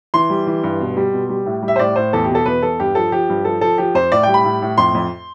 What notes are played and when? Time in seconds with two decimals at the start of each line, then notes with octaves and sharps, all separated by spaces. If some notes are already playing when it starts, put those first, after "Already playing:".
0.14 E3 C6
0.30 G3
0.47 E3
0.63 G2
0.81 B2
0.97 G3
1.13 B2
1.29 G3
1.46 A2
1.62 G3
1.68 E5
1.76 C5
1.79 A2 D5
1.96 A2 C5
2.13 E2 A4
2.24 G4
2.29 B2
2.35 A4
2.46 E2 B4
2.62 E2 A4
2.80 G2 G4
2.95 F3 A4
3.12 F3 G4
3.29 G2
3.45 F3 A4
3.61 F3 A4
3.78 F3 G4
3.95 F2 C5
4.12 A2 D5
4.23 G3 G5
4.34 B5
4.44 A2
4.62 A2
4.78 F2 C6
4.95 F2